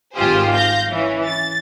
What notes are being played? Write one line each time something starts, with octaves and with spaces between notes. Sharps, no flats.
G#1 G#2 F4 G4 G#4 C5
F5 G6 A#6
E3 C#4
A6